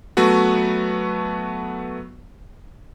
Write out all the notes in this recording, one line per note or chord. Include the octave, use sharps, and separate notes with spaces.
F#3 A3 B3 F#4